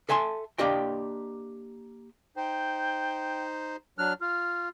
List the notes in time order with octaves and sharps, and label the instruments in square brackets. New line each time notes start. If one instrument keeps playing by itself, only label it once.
[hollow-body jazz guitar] A4 E5 G#5 A5 C6
A#3 D4 G4 D#5 G5
[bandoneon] D#4 C5 [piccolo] G5
[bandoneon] F#3 D4 F6 [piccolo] F#6
[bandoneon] F4 [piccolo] F6